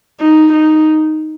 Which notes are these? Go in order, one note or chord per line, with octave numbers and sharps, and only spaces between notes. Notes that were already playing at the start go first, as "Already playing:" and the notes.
D#4
D#4